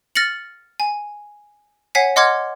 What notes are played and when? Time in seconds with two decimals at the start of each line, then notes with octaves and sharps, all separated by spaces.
0.15 F6 A6 A#6 C#7 F#7
0.80 G#5
1.95 C#5 F#5 G#5 B6 C7
2.16 D#5 F#5 C6 D6 F6 G#6